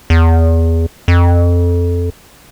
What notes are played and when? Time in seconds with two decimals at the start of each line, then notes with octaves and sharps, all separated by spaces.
0.10 E2
1.08 F2